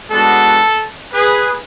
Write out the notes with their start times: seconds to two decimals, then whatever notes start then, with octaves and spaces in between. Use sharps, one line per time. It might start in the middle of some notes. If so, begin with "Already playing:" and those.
0.10 G#3 B3 D4 F#4 A4
1.13 G#4 B4